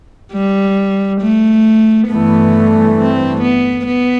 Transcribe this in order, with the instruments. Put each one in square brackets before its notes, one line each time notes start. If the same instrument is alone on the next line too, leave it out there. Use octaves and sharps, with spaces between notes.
[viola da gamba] G3
A3
[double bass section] G2 E3 A3 [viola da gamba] B3
[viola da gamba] C4
B3
B3